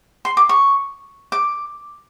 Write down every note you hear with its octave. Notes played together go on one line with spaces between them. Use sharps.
C6
D6
C#6
D6